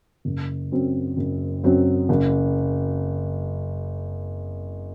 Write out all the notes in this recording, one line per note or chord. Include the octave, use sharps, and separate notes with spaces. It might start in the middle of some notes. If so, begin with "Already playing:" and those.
F#1
F#2 F#3 C4
F#1
F#2 F#3 C4
F#1